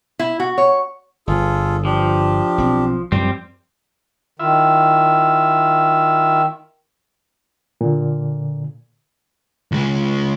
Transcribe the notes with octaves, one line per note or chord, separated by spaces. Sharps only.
E4
F#4
C#5
G1 F4 G#4 A4
F3 D4 G4
B1 C4
F#2 F3 G3 C4
D#3 E4 F4 E5
A#2 D3
C#2 G#3